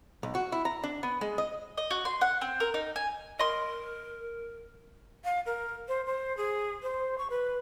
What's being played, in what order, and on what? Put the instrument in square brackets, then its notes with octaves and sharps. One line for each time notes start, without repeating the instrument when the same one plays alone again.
[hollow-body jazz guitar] B1
F#4
E4
A#5
D4
B3
G#3
D#5
[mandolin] D#5
F#4
C6
F#5
C4
A#4
D#4
G#5
[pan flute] A#4 [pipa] D#5 C6
[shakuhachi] F5
A#4
C5
C5
G#4
C5
C#6
B4